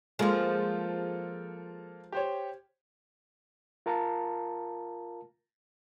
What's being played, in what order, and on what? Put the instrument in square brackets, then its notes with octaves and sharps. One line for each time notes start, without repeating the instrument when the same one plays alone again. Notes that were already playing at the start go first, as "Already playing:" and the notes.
[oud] F3 G#3 [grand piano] A#3 F4 A4
[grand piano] G4 C5 C#5
[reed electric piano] F4 A#4 F5 A5 A#5